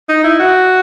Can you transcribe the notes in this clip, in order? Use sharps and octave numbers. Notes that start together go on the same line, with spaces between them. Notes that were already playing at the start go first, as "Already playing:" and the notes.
D#4
E4
F#4